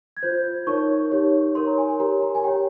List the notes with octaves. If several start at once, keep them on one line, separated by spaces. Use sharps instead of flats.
G#6
F4 C5 G6
D#4 A#4 C#5 C#6
D#4 G4 C#5
D#4 A#4 C#5 C6
A#5
G#5
G#5
G4 A#4 C#5 A#5
A#5
G#5
G4 C#5 G5